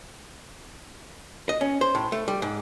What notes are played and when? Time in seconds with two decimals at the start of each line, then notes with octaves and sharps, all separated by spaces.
1.49 D#5
1.61 C#4
1.81 C5
1.95 A2
2.12 A3
2.28 G3
2.42 G#2